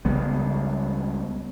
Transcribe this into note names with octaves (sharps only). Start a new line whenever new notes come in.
C#2 C#3 G3 B3